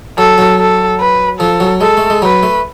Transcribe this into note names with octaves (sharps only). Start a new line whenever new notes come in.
F#3 A4
F#3
A4
B4
F3 A4
F#3
G#3 A4
A3
G#3
F#3 B4
A3